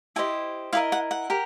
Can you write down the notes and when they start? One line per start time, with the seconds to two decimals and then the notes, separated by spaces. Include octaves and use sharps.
0.16 E4 G4 C5 D#5 G#5
0.73 E4 G4 A#4 D#5 F5
0.92 F#5
1.11 F#5
1.30 G4 A#4